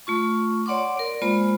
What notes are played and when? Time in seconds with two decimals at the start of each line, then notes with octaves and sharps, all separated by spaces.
0.07 A3 F4 C#6
0.66 C#5 D5 F#5 C6 D6
0.97 A#4 D5
1.22 G#3 A#3 F4 C5 B5